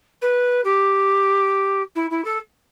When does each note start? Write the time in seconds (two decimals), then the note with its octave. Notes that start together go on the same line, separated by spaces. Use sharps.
0.21 B4
0.64 G4
1.95 E4
2.10 E4
2.24 A4